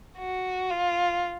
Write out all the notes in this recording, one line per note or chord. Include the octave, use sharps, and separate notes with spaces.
F#4
F4